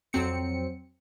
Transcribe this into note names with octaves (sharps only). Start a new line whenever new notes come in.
F2 F#3 C4 C#7